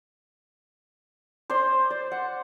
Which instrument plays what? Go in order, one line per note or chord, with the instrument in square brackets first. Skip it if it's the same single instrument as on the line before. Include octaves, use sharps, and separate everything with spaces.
[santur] C5 D5 C6
D5
F#5